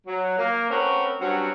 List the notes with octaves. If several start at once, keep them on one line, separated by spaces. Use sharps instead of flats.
F#3
A#3
A3 C4 C#4 F#4 A#4 B4
G2 F#3 C4 C#4 F#4